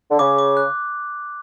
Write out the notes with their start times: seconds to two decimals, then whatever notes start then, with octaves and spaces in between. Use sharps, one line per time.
0.10 D3
0.19 C#3 D6
0.39 D6
0.57 F#6